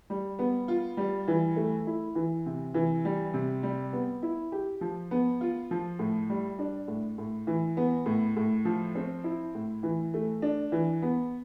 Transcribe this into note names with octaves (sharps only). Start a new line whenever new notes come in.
G3
B3
F4
G3
E3
A3
E4
E3
C3
E3
G3
C3
G3
B3
E4
G4
F3
B3
F4
F3
A2
G3
D4
A2
A2
E3
B3
A2
A2
F3
C4
E4
A2
E3
A3
D4
E3
B3